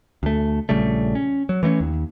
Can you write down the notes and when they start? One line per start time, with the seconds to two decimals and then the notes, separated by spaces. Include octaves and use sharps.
0.23 D2 A3
0.69 A#1 C#3 G3 A3
1.15 C#4
1.49 F#3
1.63 E3 A3 A#3 C#4
1.80 D#2